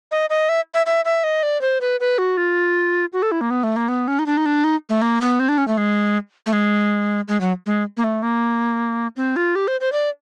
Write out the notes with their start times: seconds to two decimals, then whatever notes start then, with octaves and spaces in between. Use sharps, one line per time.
0.12 D#5
0.30 D#5
0.49 E5
0.74 E5
0.86 E5
1.05 E5
1.24 D#5
1.43 D5
1.61 C5
1.81 B4
2.00 B4
2.18 F#4
2.37 F4
3.13 F#4
3.22 A4
3.32 E4
3.41 A#3
3.50 B3
3.64 A3
3.76 A#3
3.88 B3
4.08 C#4
4.19 D#4
4.26 D4
4.37 D#4
4.46 D4
4.64 D#4
4.89 A3
5.02 A#3
5.21 B3
5.40 C4
5.49 D4
5.58 C#4
5.68 A3
5.78 G#3
6.46 A3
6.53 G#3
7.28 G#3
7.41 F#3
7.66 G#3
7.97 A#3
8.04 A3
8.23 A#3
9.16 C4
9.36 F4
9.55 G4
9.68 C5
9.81 C5
9.92 D5